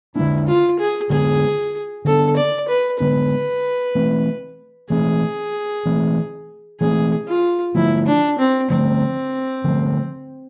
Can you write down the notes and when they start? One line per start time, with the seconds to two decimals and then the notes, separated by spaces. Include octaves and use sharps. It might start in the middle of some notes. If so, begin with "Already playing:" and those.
0.15 B3 D4 E4
0.19 D3 G#3
0.47 F4
0.79 G#4
1.10 D3 G#3 B3 D4 G#4
2.05 D3 G#3 B3 D4 A4
2.36 D5
2.68 B4
3.00 D3 G#3 B3 D4 B4
3.95 E3 A3 C4
4.90 E3 A3 C4 G#4
5.86 E3 A3 C4
6.80 E3 A3 C4 G#4
7.27 F4
7.75 D3 F3 A3 E4
8.06 D4
8.38 C4
8.70 D3 F3 A3 C4
9.64 D3 F3 A3